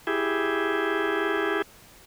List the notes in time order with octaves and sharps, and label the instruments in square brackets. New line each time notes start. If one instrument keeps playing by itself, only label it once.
[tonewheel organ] E4 G4 G#4